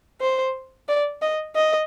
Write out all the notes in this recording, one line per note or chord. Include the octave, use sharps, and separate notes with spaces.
C5
D5
D#5
D#5